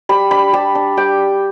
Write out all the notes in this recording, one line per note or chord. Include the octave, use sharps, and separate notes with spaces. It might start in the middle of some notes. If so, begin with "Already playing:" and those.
G3 B5
D4 B5
G3 A5
D4
G3 G5